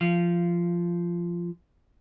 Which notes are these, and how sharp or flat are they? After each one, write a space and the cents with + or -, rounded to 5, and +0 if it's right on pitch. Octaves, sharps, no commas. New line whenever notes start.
F3 -15 F5 -20